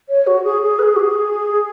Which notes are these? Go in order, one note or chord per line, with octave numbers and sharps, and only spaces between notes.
C#5
F#4
G#4
G#4
B4
G#4
F#4
G#4